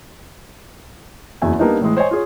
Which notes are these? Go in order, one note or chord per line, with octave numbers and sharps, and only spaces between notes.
F#1 E2 E4 F#4 E5 G#5
G3 A#3 B3 D4 D#4
A2 E3 G#3
C5 C#5 D#5 G#5
F4 G#4 C#5